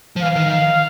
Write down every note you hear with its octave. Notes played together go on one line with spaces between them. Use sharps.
F3
E3 F5
D#3
F5